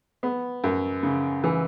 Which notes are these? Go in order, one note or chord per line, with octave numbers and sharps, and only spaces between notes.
B3
F#2
C#3
E3